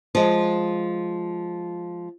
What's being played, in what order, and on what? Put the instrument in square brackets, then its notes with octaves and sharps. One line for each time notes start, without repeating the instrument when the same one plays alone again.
[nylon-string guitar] F3 G#3